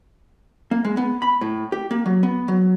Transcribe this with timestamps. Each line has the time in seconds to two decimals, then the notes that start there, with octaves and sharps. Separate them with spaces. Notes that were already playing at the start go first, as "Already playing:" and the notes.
0.71 A#3
0.85 G#3
0.97 B3
1.22 B5
1.41 A2
1.72 G4
1.91 A#3
2.06 F#3
2.23 B3
2.48 F#3